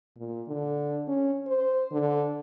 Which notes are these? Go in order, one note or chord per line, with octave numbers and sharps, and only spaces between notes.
A#2
D3
C#4
C5
D3